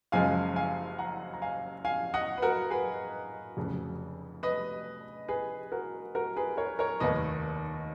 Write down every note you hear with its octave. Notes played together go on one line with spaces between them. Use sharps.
F#1 F#2 C#3 F3 G#3 F5 G#5
F5 G#5
F#5 A#5
A#5
F5 G#5
F5 G#5
D#5 F#5
B4
F#4 A#4
G#4 B4
F1 F2 C#3 F#3
B4 D#5
G#4 B4
F#4 A#4
F#4 A#4
G#4 B4
A#4 C#5
A#4 C#5
F1 D#2 D#3 A#3 B4 D#5